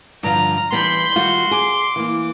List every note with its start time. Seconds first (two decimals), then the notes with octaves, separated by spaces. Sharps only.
0.23 G2 D3 F3 A#5
0.72 E3 G3 B3 B5 C6 G6
1.16 D#3 G3 F4 F#4
1.51 G#4 D6
1.96 E3 A#3